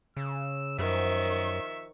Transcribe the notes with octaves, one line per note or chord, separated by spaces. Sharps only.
C#3 E6
F#2 D#3 F3 E5 C#6